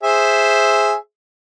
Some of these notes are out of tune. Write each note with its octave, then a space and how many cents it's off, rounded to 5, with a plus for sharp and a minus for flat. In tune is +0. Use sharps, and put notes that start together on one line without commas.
G#4 +0 C5 +0 E5 +0